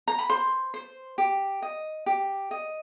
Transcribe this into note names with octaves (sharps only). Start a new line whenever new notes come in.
A#5
B5
C5 C6
C5
G4
D#5
G4
D#5